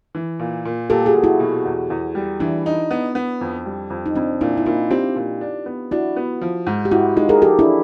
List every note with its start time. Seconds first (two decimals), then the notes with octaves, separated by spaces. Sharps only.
0.15 E3
0.40 A#2
0.65 A#2
0.90 A#2 G4 A4
1.06 F#4 G#4
1.15 A#2
1.24 E4 F#4
1.40 B2
1.65 E2
1.90 E2
2.15 G3
2.40 E3 D4 E4
2.66 D#4
2.91 B3
3.15 B3
3.41 F2
3.66 G3
3.90 F2
4.06 D#4
4.15 F2 C4 D4
4.41 A#2 D4 E4
4.57 E4
4.66 A#2 D#4 F4
4.91 C4 F4 G4
5.16 A#2
5.41 D4
5.66 B3
5.91 D4 E4 F#4
6.16 B3
6.42 F3
6.67 G#2
6.85 G4
6.91 G#2 E4 F#4
7.16 G#3 D#4 F4
7.29 G#4 A#4
7.41 F3 G4 A4
7.59 D4 E4